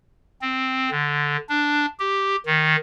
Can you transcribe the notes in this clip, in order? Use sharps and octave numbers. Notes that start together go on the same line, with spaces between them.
C4
D3
D4
G4
D#3